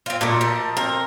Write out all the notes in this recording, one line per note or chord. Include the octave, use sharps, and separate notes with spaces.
C4 F4
A#2 A3 A4 A#4 D#5
F3
C4 A#4 C6 D6